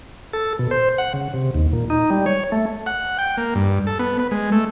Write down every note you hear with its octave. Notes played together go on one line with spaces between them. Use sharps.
A4
B2
C5
F#5
C#3
C3
D#2
A#2
D#4
G3
C#5
A3
F#5
G5
A#3
G2
A4
B3
B4
G#3
A3